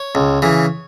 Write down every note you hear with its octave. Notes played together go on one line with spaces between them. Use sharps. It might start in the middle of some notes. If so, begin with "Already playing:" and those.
Already playing: C#5
C#2
C#3 E3